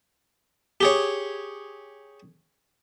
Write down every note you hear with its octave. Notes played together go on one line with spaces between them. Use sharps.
G4 G#4 C#5